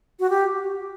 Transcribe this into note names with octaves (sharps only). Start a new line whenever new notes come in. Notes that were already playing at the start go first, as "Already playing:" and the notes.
F#4
G4